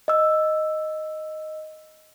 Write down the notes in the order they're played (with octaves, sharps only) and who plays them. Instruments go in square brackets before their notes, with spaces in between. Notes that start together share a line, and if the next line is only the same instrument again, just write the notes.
[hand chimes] D#5 E6